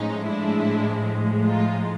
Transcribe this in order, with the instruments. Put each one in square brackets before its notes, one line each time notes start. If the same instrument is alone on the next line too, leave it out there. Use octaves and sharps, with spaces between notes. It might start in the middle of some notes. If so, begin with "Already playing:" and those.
Already playing: [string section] A2 F3 G#3 C#4 D#4
D4 E4
D#4 F4